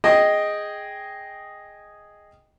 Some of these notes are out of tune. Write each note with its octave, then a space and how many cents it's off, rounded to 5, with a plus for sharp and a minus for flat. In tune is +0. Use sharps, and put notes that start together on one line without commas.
G#4 +0 D#5 +0 G5 +0